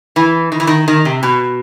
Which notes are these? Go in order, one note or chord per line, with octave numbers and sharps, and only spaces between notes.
E3
D#3
E3
D#3
D#3
C3
B2